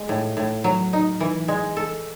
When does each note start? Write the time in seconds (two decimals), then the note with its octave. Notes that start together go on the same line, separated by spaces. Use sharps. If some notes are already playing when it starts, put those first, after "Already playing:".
Already playing: G#3
0.09 A2
0.37 A2
0.64 F#3
0.93 D#4
1.20 E3
1.48 G#3
1.77 A4